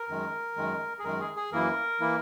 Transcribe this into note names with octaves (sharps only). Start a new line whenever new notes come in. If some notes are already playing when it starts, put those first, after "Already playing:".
Already playing: A#4
F#2 D#3 G#3
F#2 D#3 G#3
G#4
F#2 D#3 G#3 A#4
G#4
G#4
F#2 E3 A#3 E4 A#4
E3 A#3 E4